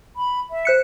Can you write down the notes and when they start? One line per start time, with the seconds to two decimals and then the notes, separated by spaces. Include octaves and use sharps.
0.16 B5
0.51 E5
0.65 C5 F#6 C#7